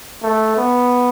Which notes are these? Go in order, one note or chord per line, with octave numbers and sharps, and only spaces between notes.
A3
B3